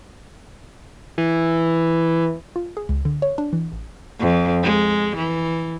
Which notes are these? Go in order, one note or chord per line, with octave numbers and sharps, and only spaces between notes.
E3
F4
G#4
C#2
D3
C#5
D4
E3
A1
F2
G#3
E3